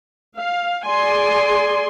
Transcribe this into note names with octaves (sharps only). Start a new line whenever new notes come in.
F5
G#4 D5 G#5 C6